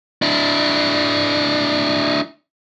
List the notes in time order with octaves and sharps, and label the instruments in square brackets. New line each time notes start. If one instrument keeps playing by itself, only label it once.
[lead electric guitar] D4 E4